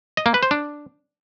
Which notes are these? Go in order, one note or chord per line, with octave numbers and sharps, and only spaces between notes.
D#5
A#3
B4
C5
D4